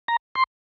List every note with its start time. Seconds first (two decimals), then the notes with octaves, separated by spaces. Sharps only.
0.08 A#5
0.35 C6